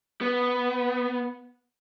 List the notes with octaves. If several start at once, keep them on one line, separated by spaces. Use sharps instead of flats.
B3